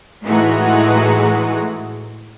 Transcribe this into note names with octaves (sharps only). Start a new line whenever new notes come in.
A2 E3 G#3 A3 D#4 F#4